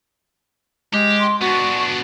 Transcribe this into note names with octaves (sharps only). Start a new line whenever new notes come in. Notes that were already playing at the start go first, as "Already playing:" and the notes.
G#3 G4
C6
B3 D4 F#4 C#6